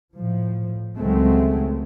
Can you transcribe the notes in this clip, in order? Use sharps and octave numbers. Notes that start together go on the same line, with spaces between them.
A2 F3
C#2 D#3 F#3 G#3 A3 C4